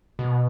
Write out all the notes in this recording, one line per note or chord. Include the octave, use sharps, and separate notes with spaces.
B2